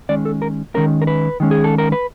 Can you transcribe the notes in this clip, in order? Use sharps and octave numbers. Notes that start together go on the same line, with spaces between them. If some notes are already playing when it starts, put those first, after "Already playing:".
D#3 G#3 C#4 D5
A4
A#4
D#3 G#3 C#4 A#4
A#4
B4
D#3 G#3 C#4
G#4
A4
A#4
B4